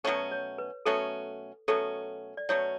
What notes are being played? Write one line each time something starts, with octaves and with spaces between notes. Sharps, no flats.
B2 F#3 A3 C#4 A4
C#5
B4
B2 F#3 A3 C#4 A4
B2 F#3 A3 C#4 A4
D5
B2 F#3 A3 C#4 C#5